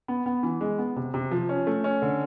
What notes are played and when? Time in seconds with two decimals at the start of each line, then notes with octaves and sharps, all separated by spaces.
0.08 B3
0.26 B3
0.43 E3
0.61 G#3
0.78 B3
0.96 C3
1.14 C3
1.31 F3
1.49 C#4
1.67 A3
1.84 C#4
2.02 D3